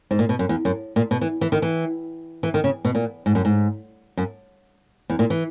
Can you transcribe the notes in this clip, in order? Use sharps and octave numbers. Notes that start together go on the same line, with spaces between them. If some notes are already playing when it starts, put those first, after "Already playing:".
G#2
A#2
B2
F#2
E2
F#2
A#2
B2
E3
E3
D#3
E3
E3
D#3
C#3
B2
A#2
G#2
F#2
G#2
F#2
E2
A#2
E3